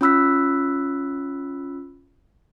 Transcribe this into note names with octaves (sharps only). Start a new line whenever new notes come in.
C#4 F4 B5 E6 F#6 B6